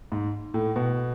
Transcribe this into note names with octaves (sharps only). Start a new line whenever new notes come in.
G#2
A2
B2